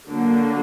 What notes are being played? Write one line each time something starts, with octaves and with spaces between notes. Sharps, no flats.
D3 F#3 A#3